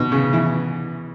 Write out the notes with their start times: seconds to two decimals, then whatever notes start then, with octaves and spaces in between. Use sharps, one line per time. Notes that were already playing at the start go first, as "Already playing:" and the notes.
Already playing: B2
0.12 C#3
0.33 E3